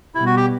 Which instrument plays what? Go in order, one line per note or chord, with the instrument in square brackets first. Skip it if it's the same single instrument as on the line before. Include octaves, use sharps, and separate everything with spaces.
[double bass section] B2 G3 B3 [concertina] E4
[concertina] F#4
G4